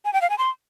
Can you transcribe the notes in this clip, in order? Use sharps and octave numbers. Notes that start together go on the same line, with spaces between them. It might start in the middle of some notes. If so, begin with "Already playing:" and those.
G#5
G5
F5
G#5
C6